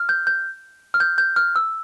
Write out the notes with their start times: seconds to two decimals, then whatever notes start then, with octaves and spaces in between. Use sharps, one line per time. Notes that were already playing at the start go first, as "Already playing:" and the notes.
Already playing: F6
0.09 G6
0.27 G6
0.94 F6
1.00 G6
1.18 G6
1.36 F6
1.56 E6